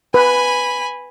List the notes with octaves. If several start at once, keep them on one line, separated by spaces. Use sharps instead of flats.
B4 G#5 B5